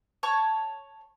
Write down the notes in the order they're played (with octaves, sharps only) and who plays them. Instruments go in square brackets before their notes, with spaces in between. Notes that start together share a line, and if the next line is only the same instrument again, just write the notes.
[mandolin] C#5 A5 C#6